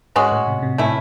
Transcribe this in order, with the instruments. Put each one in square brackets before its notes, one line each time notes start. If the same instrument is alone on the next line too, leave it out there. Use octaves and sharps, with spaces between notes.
[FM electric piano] G#2 [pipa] G#3 C#4 F#4
[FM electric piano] A2
C3
C3
[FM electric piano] A2 [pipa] A3 C#4 E4